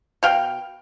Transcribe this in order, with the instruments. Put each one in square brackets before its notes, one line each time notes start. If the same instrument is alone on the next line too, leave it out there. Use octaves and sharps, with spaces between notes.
[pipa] B2 F5 G5